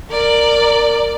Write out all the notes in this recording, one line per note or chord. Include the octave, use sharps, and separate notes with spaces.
A#4 D5